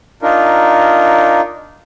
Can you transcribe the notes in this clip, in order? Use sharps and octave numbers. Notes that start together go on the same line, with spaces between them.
D4 D#4 F4 A#4